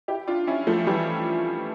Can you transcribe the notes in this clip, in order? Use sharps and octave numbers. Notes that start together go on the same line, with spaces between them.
E4 G4
D4 F4
C#4 E4
F3 A3
E3 G3